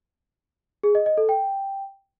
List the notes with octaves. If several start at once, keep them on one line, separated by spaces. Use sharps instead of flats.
G#4
D#5
D#5
A4
G5